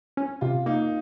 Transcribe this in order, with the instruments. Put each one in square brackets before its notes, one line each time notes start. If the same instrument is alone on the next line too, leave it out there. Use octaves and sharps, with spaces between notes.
[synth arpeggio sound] C#4
[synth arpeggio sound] C3 [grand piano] F4
[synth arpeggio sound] A#3 [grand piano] D#4